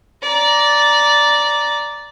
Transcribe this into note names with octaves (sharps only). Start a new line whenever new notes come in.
D5 A#5